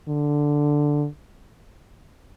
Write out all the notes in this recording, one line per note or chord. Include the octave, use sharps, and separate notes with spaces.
D3